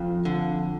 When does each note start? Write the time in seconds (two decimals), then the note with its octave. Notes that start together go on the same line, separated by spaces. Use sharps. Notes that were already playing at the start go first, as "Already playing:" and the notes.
Already playing: F2 F3 F4
0.25 D3